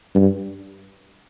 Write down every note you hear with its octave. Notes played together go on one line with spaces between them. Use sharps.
G2